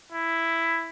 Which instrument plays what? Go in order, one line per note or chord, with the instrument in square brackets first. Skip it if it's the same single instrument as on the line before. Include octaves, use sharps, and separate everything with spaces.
[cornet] E4